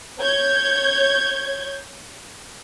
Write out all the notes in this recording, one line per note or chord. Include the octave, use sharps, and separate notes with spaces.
C#5 G6 G#6